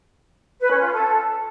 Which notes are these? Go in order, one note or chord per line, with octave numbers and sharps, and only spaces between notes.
B4
C#4
F4
A4